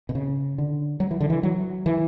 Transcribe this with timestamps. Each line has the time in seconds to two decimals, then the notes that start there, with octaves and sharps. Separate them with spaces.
0.09 B2
0.15 C#3
0.58 D3
1.00 F#3
1.11 E3
1.20 D3
1.30 E3
1.43 F#3
1.86 E3